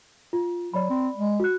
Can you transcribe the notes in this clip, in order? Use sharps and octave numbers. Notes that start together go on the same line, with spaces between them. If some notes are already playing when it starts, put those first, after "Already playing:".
F4
F#3 D5 B5
C4
G#3
F#4 F#6